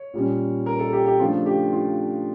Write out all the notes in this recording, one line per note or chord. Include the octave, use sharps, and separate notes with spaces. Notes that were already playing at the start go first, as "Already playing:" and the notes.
Already playing: C#5
A#2 G3 C#4
A#4
A4
G4
G4
C#3 F3 A3 D4 F4
G4
F4